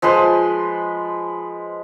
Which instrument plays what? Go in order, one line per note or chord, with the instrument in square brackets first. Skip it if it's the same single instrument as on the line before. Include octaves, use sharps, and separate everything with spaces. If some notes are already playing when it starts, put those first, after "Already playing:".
[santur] F3 G#3 B4 C6